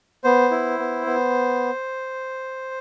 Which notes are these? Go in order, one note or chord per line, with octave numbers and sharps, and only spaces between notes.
B3 C5
E4
B3
B3